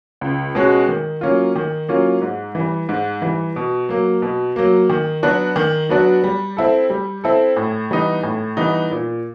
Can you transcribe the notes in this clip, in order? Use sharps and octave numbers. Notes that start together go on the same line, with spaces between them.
C#2
B2 G#3 C#4 F#4
D#3
F#3 A#3 C#4 F4
D#3
F#3 A#3 C#4 F4
G#2
E3
G3
G#2
E3 G3
B2
F#3 A#3
B2
F#3 A#3
D#3
F#3 B3 D4 F#4
D#3
F#3 B3 D4 F#4
G3
C4 E4 A4
G3
C4 E4 A4
A2
E3 G3 B3 D#4
A2
E3 G3 B3 D#4
A#2